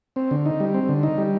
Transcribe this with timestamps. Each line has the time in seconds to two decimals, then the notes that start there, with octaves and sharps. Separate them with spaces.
0.16 C4
0.31 D3
0.46 D#4
0.60 G3
0.74 C4
0.89 D3
1.03 D#4
1.18 G3